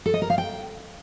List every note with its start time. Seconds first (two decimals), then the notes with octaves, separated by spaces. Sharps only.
0.06 A4
0.14 D#5
0.22 A#4
0.30 F5
0.38 G5